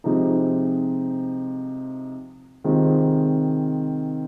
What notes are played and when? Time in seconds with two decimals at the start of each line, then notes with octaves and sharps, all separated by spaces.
0.04 C3 F3 G#3 D#4
2.64 C3 D#3 G#3 C4 F4